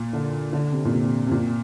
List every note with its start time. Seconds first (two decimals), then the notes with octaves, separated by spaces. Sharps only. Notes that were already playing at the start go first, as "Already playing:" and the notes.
Already playing: A#2
0.13 D3
0.53 D3
0.72 C3
0.85 A#2
0.92 C3
1.27 C3
1.31 A#2